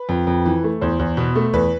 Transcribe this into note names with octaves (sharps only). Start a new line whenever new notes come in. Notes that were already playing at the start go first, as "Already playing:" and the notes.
Already playing: B4
F2
F2
E3
A3
E2 C5
E2
B2
A3
E2 B4